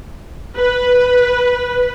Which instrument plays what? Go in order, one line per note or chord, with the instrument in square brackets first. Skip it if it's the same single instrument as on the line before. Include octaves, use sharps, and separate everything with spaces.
[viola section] B4